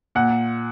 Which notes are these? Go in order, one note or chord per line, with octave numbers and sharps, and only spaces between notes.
A#2 F#5